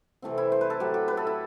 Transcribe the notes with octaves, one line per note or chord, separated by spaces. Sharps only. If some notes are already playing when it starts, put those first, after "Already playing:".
C3 E3 A3 C4
E4
C5
B4
A4
A2 F#3 A3 G4
G4
B4
A4
E4